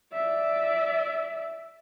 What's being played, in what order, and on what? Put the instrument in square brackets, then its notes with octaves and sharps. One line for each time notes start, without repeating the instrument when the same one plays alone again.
[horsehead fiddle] D5 E5